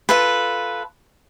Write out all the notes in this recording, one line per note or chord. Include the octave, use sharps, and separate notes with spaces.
F4 A4 B4